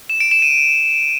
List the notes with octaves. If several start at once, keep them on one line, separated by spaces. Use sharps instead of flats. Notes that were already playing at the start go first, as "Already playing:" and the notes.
E7
D7
E7
D#7